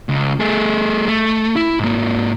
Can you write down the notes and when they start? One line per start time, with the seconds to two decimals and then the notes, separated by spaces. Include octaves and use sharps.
0.09 C#2
0.40 A3 G#4
1.08 A3
1.56 E4
1.79 G#2 A#3